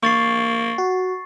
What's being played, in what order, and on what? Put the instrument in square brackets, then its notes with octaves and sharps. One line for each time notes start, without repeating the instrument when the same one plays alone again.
[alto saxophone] A#3 [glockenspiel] C#6 A6 C7
[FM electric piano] F#4